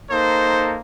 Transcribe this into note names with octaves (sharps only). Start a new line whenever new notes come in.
A#3 D#4 A4 C5